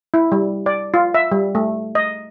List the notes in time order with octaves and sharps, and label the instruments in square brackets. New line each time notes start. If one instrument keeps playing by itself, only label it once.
[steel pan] E4
G3
D5
F4
E5
G3
A3
D#5